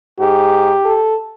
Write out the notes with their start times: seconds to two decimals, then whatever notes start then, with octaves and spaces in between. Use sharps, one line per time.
0.20 G#2 G4
0.85 A4